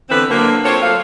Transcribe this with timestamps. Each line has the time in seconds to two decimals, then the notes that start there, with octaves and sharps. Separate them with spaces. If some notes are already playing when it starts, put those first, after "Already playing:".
0.10 D3 E3 A3 B3 C4 B4
0.30 D3 F#3 A#3
0.64 C4 F4 A4 C5 C#5
0.82 F#3 A3 F4 D5 F5